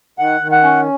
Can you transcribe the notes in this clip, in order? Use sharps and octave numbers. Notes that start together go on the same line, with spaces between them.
D#3 F#5
D#3
F#5
C#4